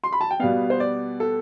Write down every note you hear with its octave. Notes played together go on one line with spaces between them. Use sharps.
C6
B5
A5
G5
B2 G3 B3 F5
C5
D5
A4